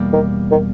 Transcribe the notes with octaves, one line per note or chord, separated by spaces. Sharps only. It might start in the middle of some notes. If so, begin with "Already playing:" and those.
Already playing: E2 B2 G3 A#3
D#3
D#3